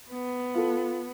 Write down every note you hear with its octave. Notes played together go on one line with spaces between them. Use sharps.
B3
F4 A4